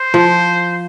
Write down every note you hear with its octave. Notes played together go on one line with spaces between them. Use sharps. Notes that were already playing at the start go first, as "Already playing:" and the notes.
Already playing: C5
F3